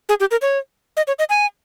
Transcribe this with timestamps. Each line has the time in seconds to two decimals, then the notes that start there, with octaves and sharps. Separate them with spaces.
0.09 G#4
0.20 G4
0.31 A#4
0.42 C#5
0.97 D#5
1.08 C#5
1.19 D#5
1.30 G#5